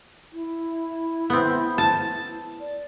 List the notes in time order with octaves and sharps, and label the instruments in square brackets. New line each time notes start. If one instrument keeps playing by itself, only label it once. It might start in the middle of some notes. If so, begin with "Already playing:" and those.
[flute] E4
[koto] B3 C4
A5
[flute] D5